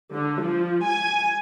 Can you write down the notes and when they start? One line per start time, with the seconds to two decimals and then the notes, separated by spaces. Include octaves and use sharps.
0.14 D3
0.43 F3
0.85 G#5